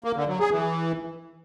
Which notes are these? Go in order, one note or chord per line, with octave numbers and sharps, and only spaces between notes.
A#3
D3
F#3
G#4
E3